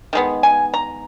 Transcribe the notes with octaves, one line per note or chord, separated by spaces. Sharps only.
D#3 G#3 B3
G#5
A#5